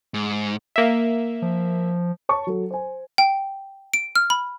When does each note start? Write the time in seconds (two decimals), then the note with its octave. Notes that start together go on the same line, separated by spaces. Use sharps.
0.14 G#2
0.76 A#3 E5
1.42 F3
2.29 C#5 A5 C#6
2.47 F#3 A4
2.71 C5 G#5
3.18 G5
3.94 D7
4.16 F6
4.30 B5